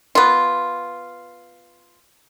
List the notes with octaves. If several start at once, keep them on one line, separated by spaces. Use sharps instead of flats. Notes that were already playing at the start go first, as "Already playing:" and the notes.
B3 F4